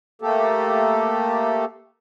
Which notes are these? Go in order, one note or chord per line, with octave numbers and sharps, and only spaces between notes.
A3 A#3 G4 A4